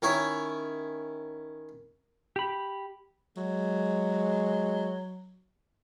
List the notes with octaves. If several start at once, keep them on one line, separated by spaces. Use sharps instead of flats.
D#3 C#4 E4 C#5
G4 B5
F#3 G#3